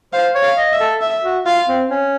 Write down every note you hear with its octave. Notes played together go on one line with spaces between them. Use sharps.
C5 F5
C#5
F5
D#5
E5
A4
E5
F#4
F4 F5
C4
C#4